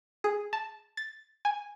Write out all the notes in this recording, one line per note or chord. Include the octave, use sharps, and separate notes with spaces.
G#4
A5
A6
G#5